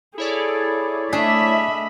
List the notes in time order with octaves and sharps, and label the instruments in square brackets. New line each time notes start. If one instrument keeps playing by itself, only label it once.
[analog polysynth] E4 C#5 D5 [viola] G#4 A4
[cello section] A3 E5 [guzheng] D4 G#4 [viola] D#5 B5